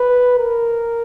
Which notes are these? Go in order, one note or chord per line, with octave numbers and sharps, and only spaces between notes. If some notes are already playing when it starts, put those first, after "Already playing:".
Already playing: B4
A#4